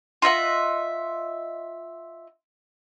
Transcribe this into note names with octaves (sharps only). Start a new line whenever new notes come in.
F4 D#5 E5 F#5